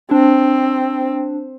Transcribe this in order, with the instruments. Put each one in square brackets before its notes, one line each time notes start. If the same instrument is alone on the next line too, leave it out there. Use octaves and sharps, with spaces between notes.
[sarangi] C4 [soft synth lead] D4